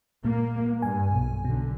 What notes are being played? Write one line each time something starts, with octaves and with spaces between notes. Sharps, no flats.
A#2 A#3
G2 G#5
B1
B1 B2 D3